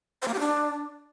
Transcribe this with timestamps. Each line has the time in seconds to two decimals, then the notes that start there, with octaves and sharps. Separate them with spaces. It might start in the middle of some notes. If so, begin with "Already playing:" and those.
0.22 C5
0.28 A#3
0.34 G4
0.39 D4